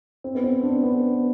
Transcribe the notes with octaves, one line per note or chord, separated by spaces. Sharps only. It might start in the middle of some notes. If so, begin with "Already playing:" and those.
C4
B3
C4
D4
B3